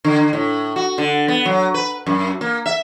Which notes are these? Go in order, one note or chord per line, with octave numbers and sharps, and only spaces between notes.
D3
A2
F#4
D3
B3
F#3
B4
F#2
A#3
E5